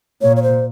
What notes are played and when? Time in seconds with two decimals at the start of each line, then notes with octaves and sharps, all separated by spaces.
0.22 A#2 C#5
0.36 C#5
0.43 C5